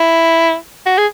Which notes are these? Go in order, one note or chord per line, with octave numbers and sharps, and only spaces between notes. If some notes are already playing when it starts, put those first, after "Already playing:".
Already playing: E4
F#4
G#4